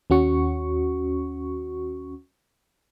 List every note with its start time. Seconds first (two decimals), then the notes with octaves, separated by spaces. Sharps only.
0.10 D#2 C#4 F#4 C#6